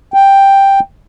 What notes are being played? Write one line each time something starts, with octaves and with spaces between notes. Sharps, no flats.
G5